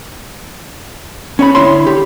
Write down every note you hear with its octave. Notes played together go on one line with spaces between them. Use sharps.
C#4 C#5 B5
D3 E4 C#5 B5 C6
G4